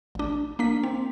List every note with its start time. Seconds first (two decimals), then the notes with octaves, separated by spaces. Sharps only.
0.15 A1 D4
0.59 A#3 D4 B6
0.83 C4